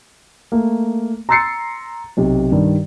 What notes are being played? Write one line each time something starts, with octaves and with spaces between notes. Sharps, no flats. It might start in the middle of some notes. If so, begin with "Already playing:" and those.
A3 A#3
A#5 C6 E6 A6 C7 C#7
B1 C3
G2 D#3